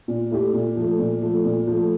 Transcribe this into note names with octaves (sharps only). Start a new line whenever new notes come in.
A#2
A3 E4 G4
A#2
F3 A3
A#2
F3 A3
A#2
F3 A3